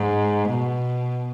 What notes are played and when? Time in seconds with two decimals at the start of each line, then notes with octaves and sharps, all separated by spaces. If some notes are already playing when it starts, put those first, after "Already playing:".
Already playing: G#2
0.49 B2